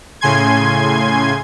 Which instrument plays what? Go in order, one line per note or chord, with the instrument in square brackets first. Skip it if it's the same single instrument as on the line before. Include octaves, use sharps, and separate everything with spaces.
[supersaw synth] A2 C#3 G#5 C6 G#6